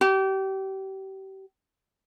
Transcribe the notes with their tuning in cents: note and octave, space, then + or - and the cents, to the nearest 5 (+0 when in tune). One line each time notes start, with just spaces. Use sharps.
G4 -30